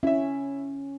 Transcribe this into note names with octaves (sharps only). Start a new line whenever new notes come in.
C#4 E4 E5